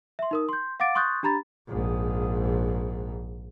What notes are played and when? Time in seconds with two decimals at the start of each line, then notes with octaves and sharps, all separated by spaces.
0.19 E5 C6
0.31 D#4 A#4 D#6
0.49 C6 G6
0.80 F5 F#5 D6 A6 D7
0.95 C6 C#6 D#6 F#6 G6 A6
1.23 D4 G4 A#5 B5 A6
1.68 A#1 G#2